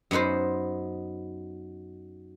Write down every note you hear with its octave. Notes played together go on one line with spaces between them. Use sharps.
F#2 B3 D#4 B4 C5